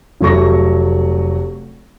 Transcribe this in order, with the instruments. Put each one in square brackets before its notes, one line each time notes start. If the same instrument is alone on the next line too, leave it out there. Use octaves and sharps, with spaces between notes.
[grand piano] F1 F#3 A3 C#6 A#6